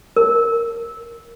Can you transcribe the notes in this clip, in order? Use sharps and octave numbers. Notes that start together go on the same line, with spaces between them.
A#4